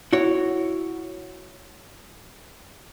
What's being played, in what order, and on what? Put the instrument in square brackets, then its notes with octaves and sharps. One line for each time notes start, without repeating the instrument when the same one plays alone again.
[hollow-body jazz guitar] E4 F#4 C#5